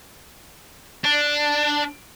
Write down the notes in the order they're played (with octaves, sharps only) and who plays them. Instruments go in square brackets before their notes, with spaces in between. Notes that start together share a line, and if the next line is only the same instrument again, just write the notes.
[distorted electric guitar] D4